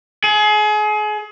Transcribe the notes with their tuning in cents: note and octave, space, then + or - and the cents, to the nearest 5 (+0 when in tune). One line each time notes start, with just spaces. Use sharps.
G#4 +30